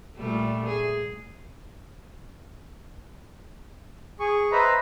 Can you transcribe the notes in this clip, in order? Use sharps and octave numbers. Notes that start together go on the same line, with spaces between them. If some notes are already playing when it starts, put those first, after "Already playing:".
A#2 G3 A3
G#4
G#4 C#6
B4 C5 D#5 E5 A#5 B5